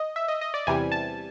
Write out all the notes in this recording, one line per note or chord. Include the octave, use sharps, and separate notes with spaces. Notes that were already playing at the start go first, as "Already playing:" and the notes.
Already playing: D#5
E5
D#5
D#5
D5
E2 C3 E3 G3 G#5
A5